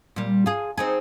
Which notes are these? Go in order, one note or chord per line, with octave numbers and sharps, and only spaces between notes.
A#2 G3
F4 G#4
C4 D#4 G#4